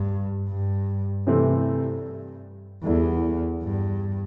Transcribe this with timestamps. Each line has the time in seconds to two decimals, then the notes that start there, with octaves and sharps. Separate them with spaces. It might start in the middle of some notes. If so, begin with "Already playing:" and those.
Already playing: G2
0.49 G2
1.27 G2 C3 E3 A3 C4
2.84 E2 G3 E4 A4 D5
3.63 G2